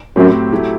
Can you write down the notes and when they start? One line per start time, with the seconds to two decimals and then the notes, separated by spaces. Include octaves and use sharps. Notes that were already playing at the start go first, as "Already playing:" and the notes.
0.16 F#2 A2 F#3 C4 G4
0.52 F#3 A3 E4 G4